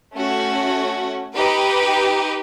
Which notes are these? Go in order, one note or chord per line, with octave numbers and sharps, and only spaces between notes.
A3 C#4 F#4
D#4 G4 B4